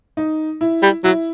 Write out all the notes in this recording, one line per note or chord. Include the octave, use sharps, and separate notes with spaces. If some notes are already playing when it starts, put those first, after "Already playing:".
D#4
E4
G3
F#3 E4